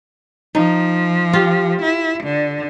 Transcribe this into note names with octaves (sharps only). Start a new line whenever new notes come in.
F3 D#4
F4 G4
E4
D3